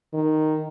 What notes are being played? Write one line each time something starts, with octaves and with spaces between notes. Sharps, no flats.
D#3